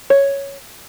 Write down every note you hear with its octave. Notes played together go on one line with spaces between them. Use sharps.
C#5